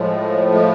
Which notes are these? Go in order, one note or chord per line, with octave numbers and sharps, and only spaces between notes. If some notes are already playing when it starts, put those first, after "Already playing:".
Already playing: A2 F3 G#3
G#3